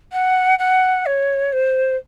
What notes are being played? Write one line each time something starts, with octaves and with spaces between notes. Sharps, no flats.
F#5
F#5
C#5
C5